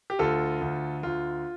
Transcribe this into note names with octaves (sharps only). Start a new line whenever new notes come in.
G4
D2 F4 A4
D2
D2 F4